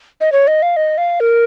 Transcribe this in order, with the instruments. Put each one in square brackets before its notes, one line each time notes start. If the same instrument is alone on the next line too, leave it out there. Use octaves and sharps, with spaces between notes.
[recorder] D#5
C#5
D#5
F5
D#5
F5
A#4